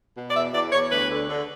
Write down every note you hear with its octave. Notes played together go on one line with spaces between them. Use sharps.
B2
D5
E2 E5
E2 D5
E2 C#5
D2 B4
D3
D3